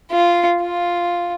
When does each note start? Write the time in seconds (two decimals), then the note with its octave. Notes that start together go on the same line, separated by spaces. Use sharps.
0.11 F4
0.61 F4